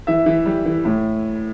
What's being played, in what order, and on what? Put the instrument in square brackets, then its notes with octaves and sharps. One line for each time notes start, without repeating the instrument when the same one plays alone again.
[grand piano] E3 E5
E3
G3
E3
A2